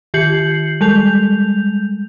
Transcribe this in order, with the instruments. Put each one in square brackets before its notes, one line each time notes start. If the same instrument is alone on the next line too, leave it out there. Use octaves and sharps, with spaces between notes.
[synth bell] D#3 G4 G6 C7 C#7 F#7
G3 G#3 G6 F7